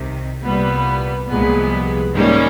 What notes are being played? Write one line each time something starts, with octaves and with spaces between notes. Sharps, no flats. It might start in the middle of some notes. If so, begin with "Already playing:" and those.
Already playing: C2 C3 D#3
C2 A#2 G3 B3
C2 A#2 F3 G#3 B3
G#2 D#3 G3 A#3 C#4